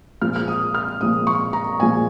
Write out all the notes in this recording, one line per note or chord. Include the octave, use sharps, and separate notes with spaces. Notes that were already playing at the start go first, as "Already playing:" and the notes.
A#2 F3 G#3 F6
F6
D#6
F6
A#2 F3 G#3 D#6
C#6
A#5
A#2 F3 G#3 G#5